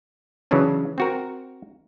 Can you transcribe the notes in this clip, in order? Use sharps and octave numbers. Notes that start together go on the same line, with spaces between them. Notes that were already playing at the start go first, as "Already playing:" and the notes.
C#3 E3 F#3 C#4 D4
C4 F#4 A#4